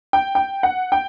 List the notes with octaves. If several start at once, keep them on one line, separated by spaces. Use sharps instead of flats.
G5
G5
F#5
G5